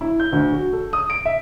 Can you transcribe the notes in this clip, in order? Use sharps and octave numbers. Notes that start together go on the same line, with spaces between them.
E4
G6
D2
F#4
A4
D#6
D7
E5